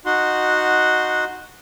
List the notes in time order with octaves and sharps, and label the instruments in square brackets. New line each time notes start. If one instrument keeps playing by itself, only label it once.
[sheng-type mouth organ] D#4 F#4 F#5 C6